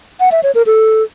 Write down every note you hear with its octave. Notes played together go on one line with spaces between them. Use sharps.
F#5
E5
C#5
A#4
A4